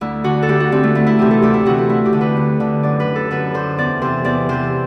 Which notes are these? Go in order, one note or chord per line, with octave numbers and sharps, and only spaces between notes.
D2 E4
D3 F#4
A4
D2 G4
F#4
D3 C4
A3
D2 E4
E4
C3 E3 G4
A4
D2 G4
E4
C3 E3 F#4
E4
D2 E4
G4
D3
B4
D2
D3
F#2 D5
B4
D3
A4
F#2 B4
D3 C5
E2 D5
C3 E3 C5
E2 D5
C3 E3 C5